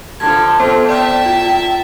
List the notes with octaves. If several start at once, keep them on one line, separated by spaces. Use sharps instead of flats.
D3 F3 A5 G#6
B3 C4 F4 A4 C5
D5 E5 G5 A5
F4